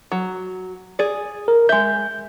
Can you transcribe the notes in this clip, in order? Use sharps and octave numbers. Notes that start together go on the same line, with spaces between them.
F#3
G#4 D5
A#4
G#3 E5 G6